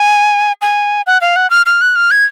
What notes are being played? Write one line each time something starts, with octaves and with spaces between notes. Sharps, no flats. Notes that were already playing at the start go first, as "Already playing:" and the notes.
Already playing: G#5
G#5
F#5
F5
F#5
F6
F6
F#6
F6
G#6